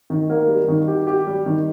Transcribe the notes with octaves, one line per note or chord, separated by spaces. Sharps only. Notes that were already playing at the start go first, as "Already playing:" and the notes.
D#3
A#3
G3
D#3
G4
G4
G3
D#3